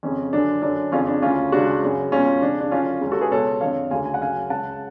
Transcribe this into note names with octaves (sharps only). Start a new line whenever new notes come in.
F2 C#3 C#4
F#2 D3 D4
F#2 D3 D4
F2 C#3 C#4 F4
D4
D2 C#3 C#4 F4
C#2 C#3 D4 F#4
F#2 C#3
C#2 B2 C#4 F4
F2 C#3 D4
D4
F#2 D3 C#4 F4
C#2 C#3
F#4 A4
G#4 B4
C#2 B2 A4 C#5
F2 D3 C#5 F5
D2 C#3 F5 G#5
G#5
F#5
F#2 C#3 F5 G#5
C#2 C#3 F#5 A5